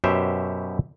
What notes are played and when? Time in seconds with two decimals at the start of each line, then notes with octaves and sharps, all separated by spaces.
0.04 F#2 B2 G4 C5 E5